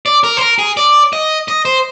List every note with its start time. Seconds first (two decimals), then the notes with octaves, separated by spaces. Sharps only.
0.06 D5
0.24 A#4
0.37 C5
0.41 A#4
0.59 G#4
0.77 D5
1.13 D#5
1.48 D#5
1.65 C5